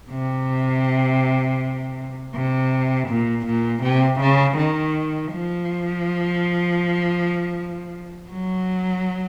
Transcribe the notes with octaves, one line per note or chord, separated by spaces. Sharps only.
C3
C3
A#2
A#2
C3
C#3
D#3
F3
F#3